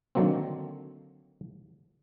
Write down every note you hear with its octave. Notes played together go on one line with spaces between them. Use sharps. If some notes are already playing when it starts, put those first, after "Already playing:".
D3 D#3 F#3 A#3 C4